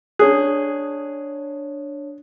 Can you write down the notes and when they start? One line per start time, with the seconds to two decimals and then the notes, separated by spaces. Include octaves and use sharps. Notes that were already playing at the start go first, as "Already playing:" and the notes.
0.19 D4 G#4 C#5 F#6